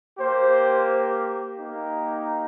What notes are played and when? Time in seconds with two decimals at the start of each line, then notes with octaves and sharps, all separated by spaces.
0.19 A#3 G4 C5
1.57 A#3 D#4 G4